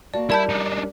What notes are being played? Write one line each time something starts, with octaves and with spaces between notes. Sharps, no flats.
A#3 F#4 D5 A5
G3 E4 A#4 D5 A5 B5 G6
D4 D#4